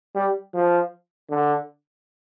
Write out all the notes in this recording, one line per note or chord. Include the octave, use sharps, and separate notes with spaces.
G3
F3
D3